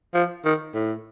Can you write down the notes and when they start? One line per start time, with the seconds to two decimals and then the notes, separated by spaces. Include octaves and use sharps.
0.14 F3
0.45 D#3
0.74 A2